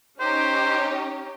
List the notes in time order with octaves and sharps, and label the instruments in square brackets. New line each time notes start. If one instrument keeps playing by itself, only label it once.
[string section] C#4 D#4 G4 [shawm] C5